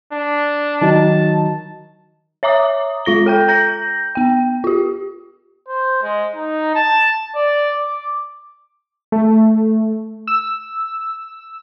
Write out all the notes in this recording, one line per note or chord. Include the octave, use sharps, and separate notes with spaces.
D4
D#3 F#3 D#4 A5
C#5 E5 A#5 D6 D#6
G#3 F4 A#6 G7
A4 G5 G6
A#5 G6 A#6
B3 G5
F4 G4
C5
G#3
D#4
A5
D5
D6
A3
E6